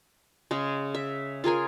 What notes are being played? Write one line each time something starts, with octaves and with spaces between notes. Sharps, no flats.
C#3 G#3
E5
F4 G#4 A#4 G#5